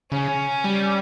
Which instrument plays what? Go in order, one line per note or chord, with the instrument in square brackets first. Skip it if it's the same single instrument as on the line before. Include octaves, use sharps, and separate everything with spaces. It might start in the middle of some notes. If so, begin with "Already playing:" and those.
[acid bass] C#3 [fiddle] C#4
[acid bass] G3